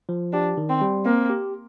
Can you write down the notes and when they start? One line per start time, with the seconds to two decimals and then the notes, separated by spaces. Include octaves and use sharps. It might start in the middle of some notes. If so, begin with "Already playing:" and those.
0.09 F3
0.33 D4 G4
0.57 D#3
0.69 C4
0.81 G3
1.06 A#3 C4
1.30 G4